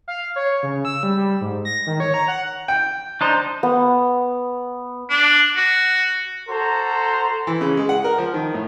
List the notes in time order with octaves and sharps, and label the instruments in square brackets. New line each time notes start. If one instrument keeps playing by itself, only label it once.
[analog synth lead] F5
C#5
C#3
E6
G3
G3
G#2
A#6
D#3
C#5
A#5
F#5
[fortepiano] G5
[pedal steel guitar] D4 D#4 C5
[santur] B3 F#5
[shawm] D4
F#4
[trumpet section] F#4 A4 C5 A#5 C6
[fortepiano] E3
C#3
G#3
F#5
A#4
F3
D#3
A2